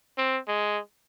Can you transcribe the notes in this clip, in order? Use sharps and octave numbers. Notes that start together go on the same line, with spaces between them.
C4
G#3